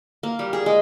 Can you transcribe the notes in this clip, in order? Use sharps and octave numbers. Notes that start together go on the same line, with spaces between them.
A#3
G3
G#4
G#3